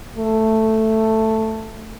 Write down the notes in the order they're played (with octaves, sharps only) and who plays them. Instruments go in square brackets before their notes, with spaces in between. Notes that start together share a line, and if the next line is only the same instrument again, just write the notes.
[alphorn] A3